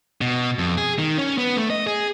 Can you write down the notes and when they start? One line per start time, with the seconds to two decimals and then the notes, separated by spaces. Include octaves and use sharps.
0.21 B2
0.59 F2
0.77 G#4
0.99 D#3
1.18 C#4
1.38 B3
1.57 A3
1.70 D#5
1.87 G#4